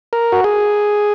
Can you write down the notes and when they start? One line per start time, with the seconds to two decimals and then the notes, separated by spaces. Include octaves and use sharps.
0.13 A#4
0.32 F#4
0.44 G#4